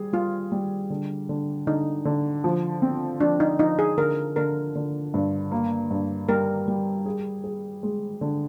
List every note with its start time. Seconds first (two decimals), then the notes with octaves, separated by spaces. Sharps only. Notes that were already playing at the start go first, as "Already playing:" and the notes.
Already playing: G3 G#4
0.13 G3 F4
0.52 G3
0.90 D3
1.29 D3
1.67 D3 D#4
2.05 D3
2.44 F3
2.82 C4
3.20 F3 D4
3.40 D#4
3.59 F3 D#4
3.79 G#4
3.97 D3 A#4
4.36 D3 A#4
4.75 D3
5.14 G2
5.52 A#3
5.91 G2
6.29 G3 A#4
6.68 G3
7.06 G#4
7.44 G#4
7.83 G#3
8.21 D3